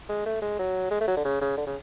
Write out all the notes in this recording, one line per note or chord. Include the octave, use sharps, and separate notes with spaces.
G#3
A3
G#3
F#3
G#3
A3
F#3
D3
C#3
C#3
D3
C#3